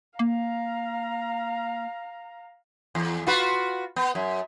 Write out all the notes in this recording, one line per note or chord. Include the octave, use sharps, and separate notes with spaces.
A#3 F5 A#5
E2
F4 F#4 B4
B3
F#2